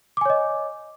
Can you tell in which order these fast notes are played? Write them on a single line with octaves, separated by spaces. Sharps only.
D6 G#5 C#5 D#5